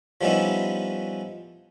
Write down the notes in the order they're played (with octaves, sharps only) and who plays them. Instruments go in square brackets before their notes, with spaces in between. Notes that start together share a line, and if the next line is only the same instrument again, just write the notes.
[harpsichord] F3 G3 B3 C#4 D#4 E4